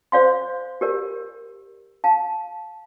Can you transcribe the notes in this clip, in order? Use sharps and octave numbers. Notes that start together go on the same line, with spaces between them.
C5 D5 F5 C6
G4 A#4 D5
F5 A5